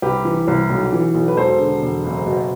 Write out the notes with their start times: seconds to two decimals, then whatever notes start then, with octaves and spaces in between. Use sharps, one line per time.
0.02 C2 G4 B4
0.25 E3
0.48 C2
0.70 B1
0.93 E3
1.14 B1
1.28 B4
1.37 E1 A4 C5
1.59 D3
1.82 E1
2.04 F#1
2.26 B2